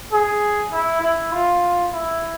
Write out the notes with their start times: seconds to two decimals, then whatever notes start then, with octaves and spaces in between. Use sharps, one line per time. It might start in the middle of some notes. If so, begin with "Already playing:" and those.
0.12 G#4
0.72 E4
1.02 E4
1.32 F4
1.92 E4